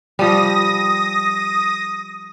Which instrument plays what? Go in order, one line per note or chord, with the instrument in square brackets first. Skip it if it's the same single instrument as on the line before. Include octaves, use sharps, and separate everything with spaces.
[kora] F3 G3 [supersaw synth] D#6 A#6